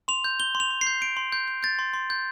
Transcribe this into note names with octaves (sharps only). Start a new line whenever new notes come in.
C6 F7
G6
G6 G7
C6
F7
C6
C7
G6
G6 D7
C6
C6 G6
G6
G6 A6
C6
C6
G6